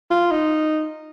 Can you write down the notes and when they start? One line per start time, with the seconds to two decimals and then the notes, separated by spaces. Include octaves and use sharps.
0.11 F4
0.31 D#4